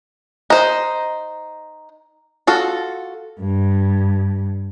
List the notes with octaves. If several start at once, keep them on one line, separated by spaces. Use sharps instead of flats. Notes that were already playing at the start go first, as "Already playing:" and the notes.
D#4 C5
F4 F#4 A4
G2